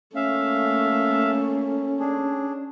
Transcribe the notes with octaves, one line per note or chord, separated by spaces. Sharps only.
A3 A#3 C#4 E5 F5
D4 G#4